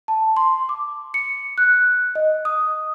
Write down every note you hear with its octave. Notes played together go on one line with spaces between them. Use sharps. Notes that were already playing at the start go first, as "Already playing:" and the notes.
A5
C6
D6
C#7
F#6
D#5
D#6